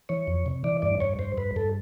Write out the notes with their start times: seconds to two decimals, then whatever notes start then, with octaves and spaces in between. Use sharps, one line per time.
0.09 E3 C#5
0.27 F2
0.46 C3
0.64 E3 D5
0.82 G2 D5
1.00 G2 C#5
1.19 G2 C5
1.37 G2 B4
1.56 G2 A4